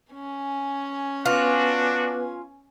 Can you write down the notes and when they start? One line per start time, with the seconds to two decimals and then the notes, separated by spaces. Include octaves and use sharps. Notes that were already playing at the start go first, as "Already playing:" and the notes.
0.13 C#4 G#5
1.26 B3 D4 F4 F#4 B4